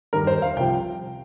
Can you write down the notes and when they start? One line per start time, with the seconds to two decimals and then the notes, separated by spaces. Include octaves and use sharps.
0.13 G2 D#3 G3 A#4
0.27 C5
0.42 F5
0.56 C2 C3 F3 G5